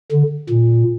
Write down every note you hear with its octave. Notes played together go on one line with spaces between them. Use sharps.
D3
A#2